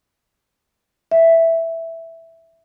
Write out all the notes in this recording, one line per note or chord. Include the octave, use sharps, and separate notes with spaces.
E5